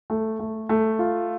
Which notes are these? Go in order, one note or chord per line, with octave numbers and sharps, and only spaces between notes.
A3
A3
A3
F4